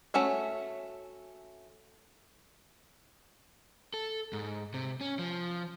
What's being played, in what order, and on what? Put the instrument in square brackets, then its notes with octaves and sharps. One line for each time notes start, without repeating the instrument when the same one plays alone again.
[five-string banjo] A3 C#4 F#4 E5
[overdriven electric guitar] A4
G#2
C3
C#4
F3